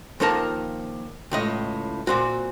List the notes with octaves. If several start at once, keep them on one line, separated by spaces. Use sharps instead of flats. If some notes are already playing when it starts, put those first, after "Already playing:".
D#2 F3 D#4 A#4 A5
C#2 A2 D#5
A#2 C4 F#4